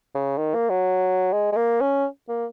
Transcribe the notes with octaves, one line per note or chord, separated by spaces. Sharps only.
C#3
D#3
A#3
F#3
G#3
G#3
A#3
C#4
A#3